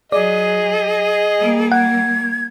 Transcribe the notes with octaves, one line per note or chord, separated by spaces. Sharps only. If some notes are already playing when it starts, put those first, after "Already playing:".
F#3 G#4 D5 D#5
G3 A#3
F#5 G#6